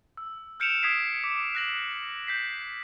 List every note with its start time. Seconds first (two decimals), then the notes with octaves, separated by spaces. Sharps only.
0.17 E6
0.60 F6 G6 C#7 D7 E7 F7
0.82 D#6 G#6 B6 C7 D7
1.24 D6 B6
1.55 F#6 A#6 F#7
2.27 G6 B6 C7